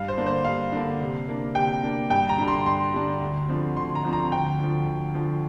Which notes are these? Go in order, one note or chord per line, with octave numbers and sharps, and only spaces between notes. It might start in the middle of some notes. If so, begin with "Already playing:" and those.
Already playing: G2 F5
C5
D3 A#3 D4
C5
G2 F5
D3 A#3 D4
C3
A#3 D4
C3 G5
A#3 D4
G2 G5
A#5
D3 G3 D4
C6
G2 C6
D3 G3 D4
D2
D3 F3 C4
D2 C6
A#5
D3 F3 C4
A#5
D2 G5
D3 F3
D2
D3 F3